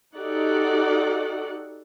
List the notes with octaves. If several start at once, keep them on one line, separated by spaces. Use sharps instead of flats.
D#4 F#4 G4 A4 D5 F#5